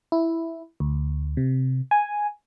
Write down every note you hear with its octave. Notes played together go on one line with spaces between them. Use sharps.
E4
D2
C3
G#5